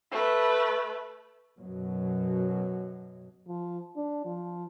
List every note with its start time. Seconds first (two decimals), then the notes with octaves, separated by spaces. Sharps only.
0.11 A3 B4
1.57 F#2 B2 F#3
3.47 F3
3.96 D4
4.25 F3